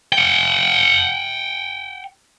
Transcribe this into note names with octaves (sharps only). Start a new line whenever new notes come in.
F#5 G5